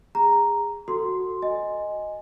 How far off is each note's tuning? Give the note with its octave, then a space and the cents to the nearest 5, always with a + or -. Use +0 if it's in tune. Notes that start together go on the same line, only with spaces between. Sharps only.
G#4 -20 A#5 +0
F#4 +0 A4 +15 C6 +0
D#5 +0 G#5 +0